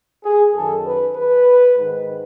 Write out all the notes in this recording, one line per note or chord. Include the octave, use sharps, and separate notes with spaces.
G#4
F#2 D#3 A4
B4
B4
G#2 D#3